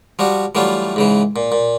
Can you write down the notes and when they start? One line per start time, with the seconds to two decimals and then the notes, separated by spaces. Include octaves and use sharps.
0.19 F3 G3 F#4
0.55 E3 F#3 G3 A3 F4
0.96 G#2 C#3 E3
1.36 A#2
1.52 A#2